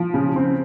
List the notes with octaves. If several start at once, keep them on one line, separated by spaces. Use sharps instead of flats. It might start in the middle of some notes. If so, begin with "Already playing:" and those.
Already playing: F3
C#3
C4